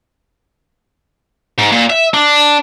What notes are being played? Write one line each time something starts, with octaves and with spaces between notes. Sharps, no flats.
G#2
A#2
E5
D4